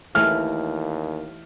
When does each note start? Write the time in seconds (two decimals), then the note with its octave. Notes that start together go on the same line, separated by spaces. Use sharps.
0.15 D#2 E3 A3 F6